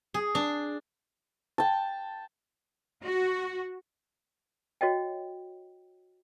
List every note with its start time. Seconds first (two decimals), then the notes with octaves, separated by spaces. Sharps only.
0.14 G#4
0.35 D4
1.58 G5 A5
3.04 F#4
4.81 F#4 C#5 D#5 G5